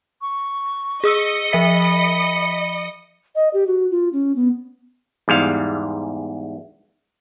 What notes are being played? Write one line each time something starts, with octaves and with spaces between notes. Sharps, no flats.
C#6
G#4 D#5 D#6 E6 C#7
F3 E5 B5 B6
D#5
G4
F#4
F4
C#4
B3
E2 G#2 G3 F5